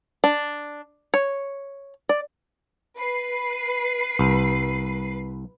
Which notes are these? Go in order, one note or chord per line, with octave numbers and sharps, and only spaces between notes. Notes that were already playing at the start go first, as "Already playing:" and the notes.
D4
C#5
D5
B4 C7
C2